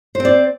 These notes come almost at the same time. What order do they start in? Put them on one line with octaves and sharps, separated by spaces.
C5 C4 D5